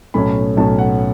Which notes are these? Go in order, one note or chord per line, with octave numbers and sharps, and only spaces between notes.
B1 A2 A3 C#4 B5
B1 A2 A3 C#4 A5
F#5